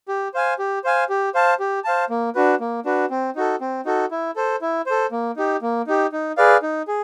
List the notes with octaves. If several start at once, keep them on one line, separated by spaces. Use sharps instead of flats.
G4
C5 F5 G#5
G4
C5 F5 G#5
G4
C5 F5 A5
G4
C5 F5 A5
A#3
D4 F#4 B4
A#3
D4 F#4 B4
C4
D#4 F#4 A4
C4
D#4 F#4 A4
E4
A4 C5
E4
A4 C5
A#3
D#4 G4
A#3
D#4 G4
D#4
G#4 B4 D5 F5
D#4
G#4